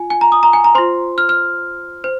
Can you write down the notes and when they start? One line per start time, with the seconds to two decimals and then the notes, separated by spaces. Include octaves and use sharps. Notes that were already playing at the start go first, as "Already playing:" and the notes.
Already playing: F4 G#5
0.10 G#5
0.21 A#5
0.32 D#6
0.43 A#5
0.53 G#5
0.64 A#5
0.75 F4 C5 C6
1.18 F6
1.29 F6
2.04 C5